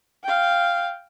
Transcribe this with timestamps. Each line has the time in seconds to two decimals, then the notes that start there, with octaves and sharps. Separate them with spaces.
0.24 F5 G5